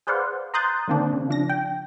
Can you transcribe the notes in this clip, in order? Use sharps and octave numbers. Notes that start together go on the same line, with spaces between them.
G#4 B4 C5 D5 F5 F#5
A#5 C6 D#6 F#6 G6 A6
D3 D#3 A#3 C4 D4
C#3
F3 D4 A#6
G5